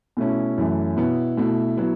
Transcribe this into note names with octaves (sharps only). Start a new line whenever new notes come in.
B2 A3 C#4 E4
F#2 E3 A3
B2 B3 E4
B2 A3 E4
F#3 B3 E4